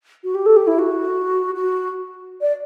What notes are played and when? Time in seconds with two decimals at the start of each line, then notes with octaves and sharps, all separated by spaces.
0.24 F#4
0.34 G4
0.46 A4
0.56 G4
0.67 E4
0.79 F#4
1.55 F#4
2.41 D5